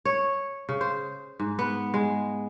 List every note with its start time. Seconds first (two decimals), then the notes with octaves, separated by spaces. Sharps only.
0.05 C#5
0.69 C#3
0.81 C5
1.40 G#2
1.59 B3
1.94 G#3